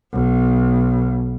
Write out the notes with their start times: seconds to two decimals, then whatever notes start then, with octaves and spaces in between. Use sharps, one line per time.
0.14 B1